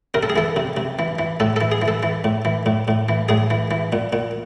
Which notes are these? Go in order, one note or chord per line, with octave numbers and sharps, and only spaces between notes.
C3 A#4
A4
G#4
E3 A4
C3
C3
E3
E3
A2 A4
E3 A4
G#4
E3
A4
E3
A2
E3
A2
A2
E3
A2 G#4
E3
E3
A#2
A#2